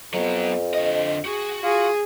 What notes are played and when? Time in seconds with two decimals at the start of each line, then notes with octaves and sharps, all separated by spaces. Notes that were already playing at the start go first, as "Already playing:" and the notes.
0.14 F2 F#3 B3
0.74 D3 D#5
1.25 F#4 G#4
1.63 F4 G#4